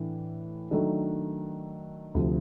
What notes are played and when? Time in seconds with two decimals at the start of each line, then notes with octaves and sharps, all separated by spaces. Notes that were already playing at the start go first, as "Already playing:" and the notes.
Already playing: A2 E3 D4
0.71 D#3 F#3 A3 D4
2.15 D2 C3 F3